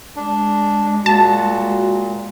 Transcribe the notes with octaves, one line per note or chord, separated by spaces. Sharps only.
G#3 D4
A#2 F#4 A5